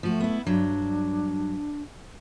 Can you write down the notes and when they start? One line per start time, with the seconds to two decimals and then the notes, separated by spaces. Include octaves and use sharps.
0.03 F3 A3 F#4
0.21 B3 E4
0.46 G2 F#3 D4